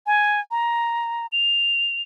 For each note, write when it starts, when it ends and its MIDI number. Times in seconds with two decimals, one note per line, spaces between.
0.07 0.40 80
0.51 1.27 82
1.32 2.02 101